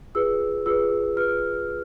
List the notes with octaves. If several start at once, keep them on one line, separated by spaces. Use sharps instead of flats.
F4 G#4 B4 E6
F4 G#4 B4 E6
F4 G#4 B4 F6